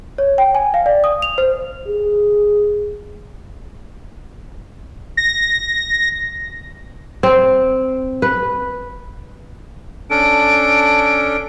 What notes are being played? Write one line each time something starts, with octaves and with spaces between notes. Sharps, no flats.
C#5
G5
G#5
F5
D5
D#6
F7
C5
G#4
A#6
C4
B4
C#4 D4 A4 D7